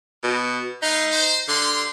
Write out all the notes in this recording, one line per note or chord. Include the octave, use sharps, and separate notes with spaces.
B2
A3 D#4 B4 F5
C5
D3 G4 F5 C6